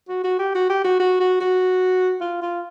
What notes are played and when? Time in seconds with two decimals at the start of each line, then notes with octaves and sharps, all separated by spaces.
0.09 F#4
0.24 F#4
0.39 G4
0.55 F#4
0.70 G4
0.84 F#4
1.00 F#4
1.20 F#4
1.40 F#4
2.21 F4
2.42 F4